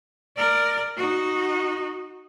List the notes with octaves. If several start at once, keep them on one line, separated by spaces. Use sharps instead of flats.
A#4 D5
D#4 F#4